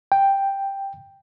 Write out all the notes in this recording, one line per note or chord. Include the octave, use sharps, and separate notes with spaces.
G5